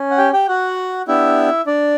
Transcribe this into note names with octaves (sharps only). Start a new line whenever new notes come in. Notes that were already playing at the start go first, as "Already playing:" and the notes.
Already playing: C#4
F#5
G4 G5
G4 G5
F#4 F#5
B3 D4 E4 G4 E5
D4 D5